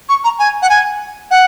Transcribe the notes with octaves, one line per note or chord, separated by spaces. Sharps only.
C#6
A#5
G#5
F#5
G#5
F#5